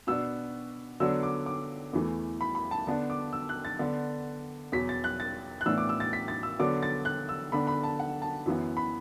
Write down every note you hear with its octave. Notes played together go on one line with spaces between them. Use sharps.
B2 B3 D4 E6
D3 F#3 B3 D4 E6
D6
D6
E2 E3 A3
B5
B5
A5
D3 B3 D4 A5
D6
E6
F#6
A6
D3 B3 D4
E2 B2 F#3 B6
A6
F#6
A6
F#6
A2 E3 B3 D4 E6
D6
E6
A6
B6
A6
E6
D3 F#3 B3 D4 D6
A6
F#6
E6
D3 B3 D4 B5
B5
A5
F#5
A5
F#2 E3 B3
B5